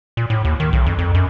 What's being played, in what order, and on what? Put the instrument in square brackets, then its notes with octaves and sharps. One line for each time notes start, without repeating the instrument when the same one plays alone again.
[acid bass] A#2
A2
D#2
D#3
B1
F2
F2
F#2